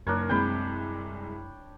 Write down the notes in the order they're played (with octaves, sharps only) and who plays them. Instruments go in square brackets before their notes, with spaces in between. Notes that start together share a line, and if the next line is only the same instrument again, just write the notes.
[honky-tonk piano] F#1 [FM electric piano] F#2 [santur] D4 A#4 C#5
[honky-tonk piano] C2 G#3 C4 [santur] G5 B5